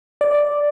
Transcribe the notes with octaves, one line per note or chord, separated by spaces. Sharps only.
D5